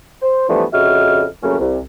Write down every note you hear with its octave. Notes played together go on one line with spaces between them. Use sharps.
C5
E3 F3 G3 A3 B3 D4
F2 C#3 F#4 D#5 E5 F6
F2 C#3 F#3 A3 A#3 C#4
C2